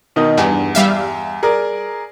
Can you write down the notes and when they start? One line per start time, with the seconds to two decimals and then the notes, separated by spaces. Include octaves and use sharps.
0.16 B2 D#3 D#4
0.37 E2 G2
0.75 G3 E5 F5
1.43 G#4 A#4 D5